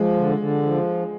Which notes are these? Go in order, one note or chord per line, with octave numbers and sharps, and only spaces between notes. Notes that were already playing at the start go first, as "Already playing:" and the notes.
Already playing: F3 G#3
D3
D3
F3